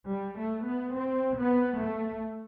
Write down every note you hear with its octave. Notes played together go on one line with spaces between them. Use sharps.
G3
A3
B3
C4
B3
A3